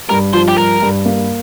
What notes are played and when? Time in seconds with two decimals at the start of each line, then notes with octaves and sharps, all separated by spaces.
0.09 G2 A#4
0.33 F3 C5
0.48 G4
0.57 G2 A#4
0.82 G2
1.05 A#3